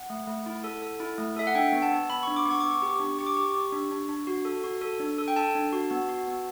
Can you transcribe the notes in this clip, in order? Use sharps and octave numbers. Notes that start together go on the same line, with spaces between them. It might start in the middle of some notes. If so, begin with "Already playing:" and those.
Already playing: F#5
A3
A3
E4
A4
A4
E4
A3
A4 E5
F#5
D4 G5
B3
A5
B3
B3 B5
D4 C#6
D6
B3
C#6
B3 D6
C#6
G4
D4
G4 C#6
D6
G4 C#6
G4
D4
D4
D4
F#4
A4
F#4
A4
D4
A4
G5
A4 A5
D4
F#4
B3
F#4
B3